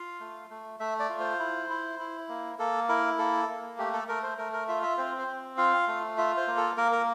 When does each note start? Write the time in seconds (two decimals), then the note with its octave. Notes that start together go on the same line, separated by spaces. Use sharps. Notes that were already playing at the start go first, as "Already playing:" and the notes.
Already playing: F4 F5
0.20 A3
0.50 A3
0.80 A3 E5
1.00 D5
1.10 F4
1.19 C5
1.40 E4
1.70 E4
1.99 E4
2.29 A#3
2.59 A#3 A4
2.89 E4 A#4
3.18 A#3 A4
3.48 A#3
3.78 A3 G4
3.93 A4
4.09 A3 A#4
4.23 C5
4.38 A3 A#4
4.53 A#4
4.68 F4 E5
4.83 E5
4.98 C4 C5
5.18 C5
5.28 C4
5.58 F4 F5
5.88 A3
6.18 F4 E5
6.37 C5
6.48 A#3
6.57 A4
6.77 A#3 A#4
6.92 A#4